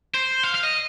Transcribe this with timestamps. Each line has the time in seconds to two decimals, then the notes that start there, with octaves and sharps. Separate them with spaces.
0.14 C5
0.43 F5
0.54 F5
0.63 D#5